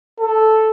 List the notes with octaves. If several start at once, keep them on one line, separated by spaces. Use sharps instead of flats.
A4